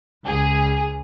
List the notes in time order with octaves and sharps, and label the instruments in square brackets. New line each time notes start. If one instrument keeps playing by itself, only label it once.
[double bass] C#2 [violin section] G#4